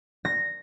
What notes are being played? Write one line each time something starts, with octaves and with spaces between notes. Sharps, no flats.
A#6